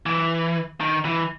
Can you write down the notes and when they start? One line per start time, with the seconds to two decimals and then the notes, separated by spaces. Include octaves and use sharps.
0.06 E3
0.80 D#3
1.05 E3